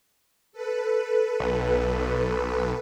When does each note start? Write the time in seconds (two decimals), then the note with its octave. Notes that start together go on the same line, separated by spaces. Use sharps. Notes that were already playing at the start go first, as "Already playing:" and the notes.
0.52 A4 B4
1.40 B1